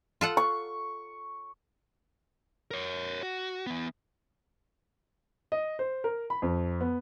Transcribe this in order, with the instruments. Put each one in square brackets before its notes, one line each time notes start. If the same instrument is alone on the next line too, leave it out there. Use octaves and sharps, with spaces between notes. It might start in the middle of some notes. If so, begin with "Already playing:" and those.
[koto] F4 A4 F#5
[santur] C#6
[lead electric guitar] A#4 C#5
F#4
E3 B3
[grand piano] D#5
C5
A#4
B5
F2
B3